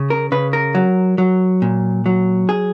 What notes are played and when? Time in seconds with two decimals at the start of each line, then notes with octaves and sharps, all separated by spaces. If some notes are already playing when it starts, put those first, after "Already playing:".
Already playing: C#3
0.10 A#4
0.32 C#3 B4
0.53 A#4
0.75 F#3
1.18 F#3
1.62 A#2
2.06 F#3
2.49 G#4